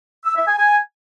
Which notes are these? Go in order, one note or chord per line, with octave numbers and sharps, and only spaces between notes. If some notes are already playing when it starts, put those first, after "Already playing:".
E6
E5
G#5
G#5